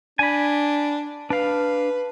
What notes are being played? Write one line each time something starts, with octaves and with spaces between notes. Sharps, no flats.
D4 G#5 B5
D4 B4 F5